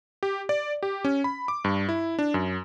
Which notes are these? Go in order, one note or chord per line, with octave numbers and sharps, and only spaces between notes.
G4
D5
G4
C#4
B5
D6
G2
E4
D4
F#2